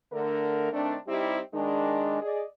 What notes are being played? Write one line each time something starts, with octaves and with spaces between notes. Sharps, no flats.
D3 A3 A#4
D#3 A3 C4 D4
G3 C4 D#4 E4 G4
D#3 G#3 D4
G#4 D5 D#5